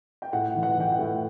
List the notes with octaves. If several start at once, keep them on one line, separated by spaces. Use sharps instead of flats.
G5
A2 F#5
E3
F#5
E3 G5
F#5
A2